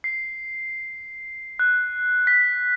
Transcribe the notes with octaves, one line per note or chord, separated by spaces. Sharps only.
C7
F#6
B6